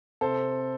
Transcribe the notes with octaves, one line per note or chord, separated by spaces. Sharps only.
C3 A4 C5